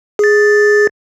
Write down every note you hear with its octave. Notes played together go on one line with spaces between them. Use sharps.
G#4 A6